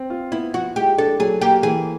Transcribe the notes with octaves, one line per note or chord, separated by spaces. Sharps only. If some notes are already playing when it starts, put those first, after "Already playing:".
Already playing: C4
F4
B3 E4
F3 F#4
G#3 G4
D4 A4
F#3 G#4
A#3 G4
E3 G#4